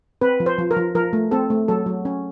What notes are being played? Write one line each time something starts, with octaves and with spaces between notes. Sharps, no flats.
C4 B4
F3
C5
F3
A#4
F3
F3 A#4
A3
C4 A4
A3
F#3 A4
F#3
C#4